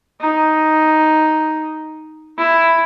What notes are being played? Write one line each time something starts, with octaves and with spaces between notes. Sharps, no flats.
D#4
E4